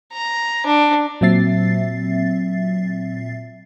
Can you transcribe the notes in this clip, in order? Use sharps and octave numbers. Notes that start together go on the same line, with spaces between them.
A#5
D4
A#2 F#3 C4 E5 A6 C7